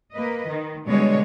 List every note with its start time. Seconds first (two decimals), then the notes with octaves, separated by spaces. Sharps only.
0.12 A#3 B4 D#5
0.49 D#3
0.87 B2 D3 G3 G#3 C#5